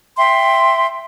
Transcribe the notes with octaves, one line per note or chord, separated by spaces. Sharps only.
E5 G5 C6